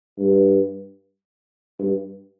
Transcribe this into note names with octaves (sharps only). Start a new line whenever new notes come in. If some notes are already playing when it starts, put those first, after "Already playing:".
G2
G2